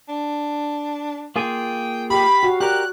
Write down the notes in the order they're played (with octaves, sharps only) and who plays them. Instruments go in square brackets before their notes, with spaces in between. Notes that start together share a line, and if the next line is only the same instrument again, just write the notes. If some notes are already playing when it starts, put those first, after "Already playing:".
[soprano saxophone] D4
[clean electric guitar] A#3 F4 G#4 [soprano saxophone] G5
[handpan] G4 [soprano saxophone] F5 [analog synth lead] B5
[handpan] F#4
[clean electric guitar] G4 A#4 [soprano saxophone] D5 [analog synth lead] F#6